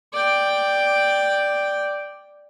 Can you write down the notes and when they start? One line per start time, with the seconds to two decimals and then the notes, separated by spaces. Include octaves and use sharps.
0.13 D5 G5